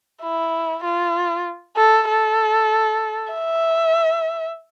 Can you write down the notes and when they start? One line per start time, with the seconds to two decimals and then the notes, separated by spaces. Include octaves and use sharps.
0.22 E4
0.84 F4
1.77 A4
2.09 A4
3.33 E5